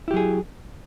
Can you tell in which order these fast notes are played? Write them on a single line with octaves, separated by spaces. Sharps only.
E4 G4 F#3 G#4